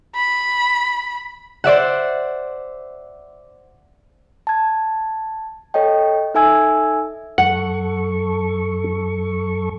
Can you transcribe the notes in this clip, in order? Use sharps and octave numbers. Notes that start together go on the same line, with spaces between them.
B5
C5 D5 E5 F#5
A5 G#6
A4 C#5 D#5 G5
D#4 A4 E5 G#5 E6 G#6
F#2 A4 F#5 C#6